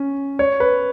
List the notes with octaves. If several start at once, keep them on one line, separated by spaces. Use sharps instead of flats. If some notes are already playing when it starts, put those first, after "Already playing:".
Already playing: C#4
C#5
B4